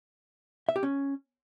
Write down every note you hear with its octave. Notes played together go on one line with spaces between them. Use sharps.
E5
G4
C#4